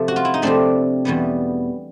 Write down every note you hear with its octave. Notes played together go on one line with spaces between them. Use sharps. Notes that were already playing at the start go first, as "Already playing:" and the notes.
Already playing: C3 F3 A3
F#4
F4
E4
D#4
C3 F3 A3 C4 D4
E2 B2 G3 B3